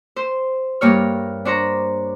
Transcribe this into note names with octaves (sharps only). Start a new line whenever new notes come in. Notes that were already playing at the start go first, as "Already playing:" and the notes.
C5
G2 A#3 C#5 F6
D4 C5 C#5 A#5